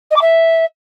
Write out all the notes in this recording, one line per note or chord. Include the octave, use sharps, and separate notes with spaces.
D#5
D6
E5